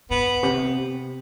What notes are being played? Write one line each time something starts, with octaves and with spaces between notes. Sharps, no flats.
G2 B3
C3